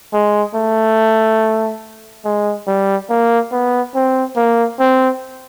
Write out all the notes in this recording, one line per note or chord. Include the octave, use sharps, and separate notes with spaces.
G#3
A3
G#3
G3
A#3
B3
C4
A#3
C4